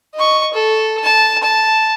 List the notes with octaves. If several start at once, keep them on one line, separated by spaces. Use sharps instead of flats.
D#5 C#6
A4
A5
A5